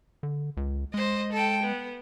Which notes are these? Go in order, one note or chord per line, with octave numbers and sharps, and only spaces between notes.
D3
C#2
G#3 C5 D#5
A4 G5
B3